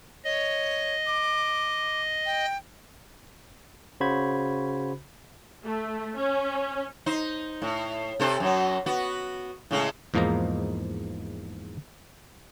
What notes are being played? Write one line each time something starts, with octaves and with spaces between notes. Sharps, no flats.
C#5 D#5
D6
G5
C#3 F#4 C5 B5 G#6
A3
C#4
D#4 C5
A2
C3 A4 C5
F#2 F#3
B3 F#4
A2 C#3 G#3
E2 G#2 F3 A#3 D#4 A#5